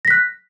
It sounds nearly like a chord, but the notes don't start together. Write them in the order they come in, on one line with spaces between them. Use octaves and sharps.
A#6 B6 F#6